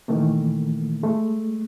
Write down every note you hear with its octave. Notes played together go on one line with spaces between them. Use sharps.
A#2 D#3 E3 A3 A#3
G#3 A3